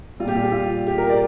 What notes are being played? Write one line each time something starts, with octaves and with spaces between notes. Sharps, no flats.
A#2 G3 F4 G4
F4
G4
F4
G4
A#4
D5